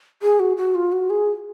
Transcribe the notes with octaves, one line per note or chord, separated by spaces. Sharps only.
G#4
F#4
F#4
F4
F#4
G#4